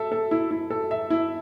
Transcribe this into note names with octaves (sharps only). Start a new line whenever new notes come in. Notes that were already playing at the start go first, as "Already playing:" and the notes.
Already playing: A4 E5
A4
E4
E4
A4
E5
E4